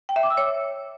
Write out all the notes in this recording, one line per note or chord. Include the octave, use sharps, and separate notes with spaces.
G5
E5
D6
E6
C#5